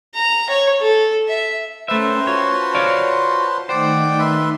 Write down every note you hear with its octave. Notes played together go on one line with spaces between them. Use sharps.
A#5
C#5
A4
E5
A3 C#4 B4 C5 E5 G5 A#5 C6
F4 F#4 C#5 A5
C#5 D5 F5
D#3 A3 D#4 C5 D5 F#5 G5
B4 E5 C6